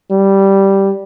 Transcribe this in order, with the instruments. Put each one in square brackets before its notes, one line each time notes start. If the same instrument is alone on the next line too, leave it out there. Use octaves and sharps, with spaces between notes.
[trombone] G3